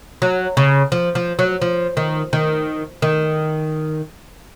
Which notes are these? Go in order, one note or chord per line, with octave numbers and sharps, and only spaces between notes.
F#3
C#3
F3
F3
F#3
F3
D#3
D#3
D#3